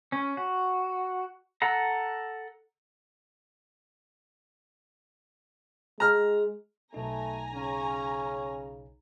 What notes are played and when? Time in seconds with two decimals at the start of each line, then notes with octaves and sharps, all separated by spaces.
0.12 C#4
0.37 F#4
1.62 A4 F#5 A#5
6.00 G#3 A#5 F6
6.94 B1 A3 D#4 G#5 A#5
7.54 C#3 C#4